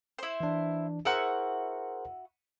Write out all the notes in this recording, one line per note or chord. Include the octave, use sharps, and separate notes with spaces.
E4 C5
E3 D4
E4 F#4 G#4 A#4 C5 F#5